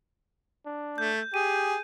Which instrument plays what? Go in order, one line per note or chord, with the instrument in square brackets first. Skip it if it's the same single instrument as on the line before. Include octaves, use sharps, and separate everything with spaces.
[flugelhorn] D4
[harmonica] A3 [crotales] G6
[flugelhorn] G4 [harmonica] G#4 [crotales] D#7